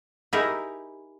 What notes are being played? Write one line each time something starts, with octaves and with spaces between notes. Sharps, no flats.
D#4 E4 G4 G#4 A#4